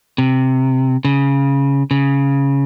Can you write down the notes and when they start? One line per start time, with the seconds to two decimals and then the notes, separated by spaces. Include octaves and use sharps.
0.18 C3
1.05 C#3
1.91 C#3